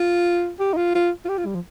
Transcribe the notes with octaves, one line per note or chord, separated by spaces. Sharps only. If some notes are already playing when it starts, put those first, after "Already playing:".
Already playing: F4
G4
D#4
F4
F4
F4
G4
F4
G3
F3